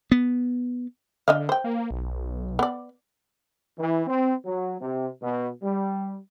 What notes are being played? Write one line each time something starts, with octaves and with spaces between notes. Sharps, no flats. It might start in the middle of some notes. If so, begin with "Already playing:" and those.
B3
D3 D4 D#5 F5
C5 G5
A#3
B1
B3 D5
E3
C4
F#3
C3
B2
G3